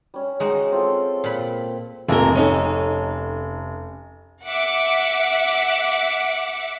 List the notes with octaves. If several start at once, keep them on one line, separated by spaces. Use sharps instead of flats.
G3 C#4
G#3 D#4 F#4
C4 F4 A4
A#2 B5
F1 F2 A#3 A#4
C#4 D#4 A4
E5 F#5 D6